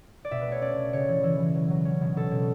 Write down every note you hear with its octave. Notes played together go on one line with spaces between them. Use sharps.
D5
B2 E5
B4
A3
C#5
C#4 D5
B2
C#3 C#5
E3
E3
E3
F#3
F#3
C#4
B2
B2 A4
B2